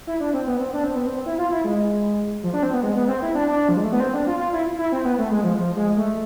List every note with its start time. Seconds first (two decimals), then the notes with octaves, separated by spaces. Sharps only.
0.07 E4
0.20 D4
0.33 C4
0.47 B3
0.60 C4
0.73 D4
0.84 C4
0.96 B3
1.06 C4
1.26 E4
1.38 F4
1.51 E4
1.64 G#3
2.43 F3
2.53 D4
2.63 C4
2.73 B3
2.83 G#3
2.95 B3
3.08 C4
3.22 E4
3.35 D4
3.48 D4
3.69 F3
3.77 G#3
3.84 A3
3.92 B3
4.00 C4
4.13 D4
4.27 F4
4.39 F4
4.53 E4
4.79 E4
4.92 C4
5.05 B3
5.19 A3
5.31 G#3
5.44 F3
5.57 F3
5.76 G#3
5.97 A3